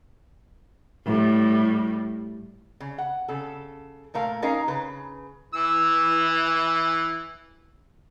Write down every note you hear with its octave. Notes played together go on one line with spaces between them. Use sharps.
A2 G3
C#3
F#5
C#3 A4
A#2 A3 A#4 F5
C#4 D#4 A#4 F5 A#5
C#3 B4
E3 E6